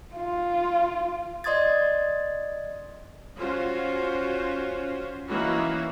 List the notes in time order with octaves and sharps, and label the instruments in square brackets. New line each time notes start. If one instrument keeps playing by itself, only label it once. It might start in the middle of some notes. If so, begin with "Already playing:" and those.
[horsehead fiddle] F4
[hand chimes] D5 D#5 C6 D#6 G#6 A6
[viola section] C#4 F4 F#4 C5
E3 A#3 C#4 D#4 E4 F#4